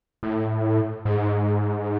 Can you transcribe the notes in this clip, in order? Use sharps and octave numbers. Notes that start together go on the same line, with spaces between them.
A2
G#2